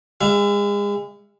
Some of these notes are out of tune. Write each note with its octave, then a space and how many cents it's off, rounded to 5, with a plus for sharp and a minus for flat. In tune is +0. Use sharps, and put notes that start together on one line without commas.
G#3 -35 E5 +30